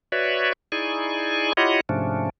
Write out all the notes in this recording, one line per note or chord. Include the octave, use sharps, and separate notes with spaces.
F#4 B4 C#5 D5 E5
D#4 E4 G#4 D5 G#5 C#6
E4 F4 G4 C#5 D#5 F#5
G#2 C3 F3 A3 C#4 D4